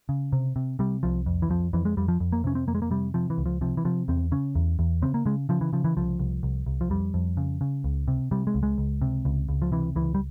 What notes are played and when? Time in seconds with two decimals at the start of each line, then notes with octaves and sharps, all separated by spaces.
0.09 C#3
0.33 C3
0.56 C3
0.79 C3 G3
1.03 C2 F3
1.26 F2
1.42 E3
1.50 F2 F3
1.73 F2 E3
1.85 G#3
1.97 F2 G3
2.08 F3
2.20 F2
2.32 A#3
2.44 C3 C#4
2.55 C4
2.67 F2 A#3
2.75 G#3
2.82 A#3
2.91 C3 G3
3.14 C3 F3
3.30 E3
3.38 C#2
3.46 F3
3.61 C3 F3
3.77 E3
3.85 C3 F3
4.08 E2 C4
4.32 C#3 C#4
4.55 E2
4.79 E2
5.02 C#3 C4
5.14 A#3
5.26 C#3 G#3
5.49 C#3 F3
5.61 E3
5.73 C#3 F3
5.84 E3
5.96 C2 F3
6.19 C2
6.43 C2
6.66 C2
6.81 F3
6.90 F2 G3
7.14 F2
7.37 C#3
7.61 C#3
7.84 C#2
8.08 C3
8.31 C3 G3
8.47 G#3
8.55 C#2
8.63 G#3
8.78 C#2
9.02 C3
9.25 C#2
9.49 C#2
9.62 F3
9.72 C3 E3
9.96 C#2 E3
10.15 G3